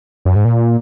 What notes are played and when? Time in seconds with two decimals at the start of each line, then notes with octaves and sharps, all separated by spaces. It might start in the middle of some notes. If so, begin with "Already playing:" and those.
0.25 F#2
0.36 G#2
0.45 A#2